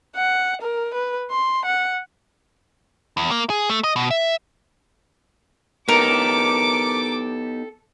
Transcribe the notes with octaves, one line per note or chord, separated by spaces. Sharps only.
F#5
A#4
B4
C6
F#5
E2
A#3
G#4
A3
D#5
B2
E5
B3 D#4 G4 A4 A#4 D6